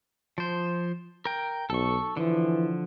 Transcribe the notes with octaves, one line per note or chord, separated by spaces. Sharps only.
F3 C5
A#4 G5
B1 A4 C#6
D3 E3 F3